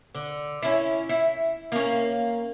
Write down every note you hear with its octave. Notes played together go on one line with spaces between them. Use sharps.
D3
C#4 E4
E4
A#3 C#4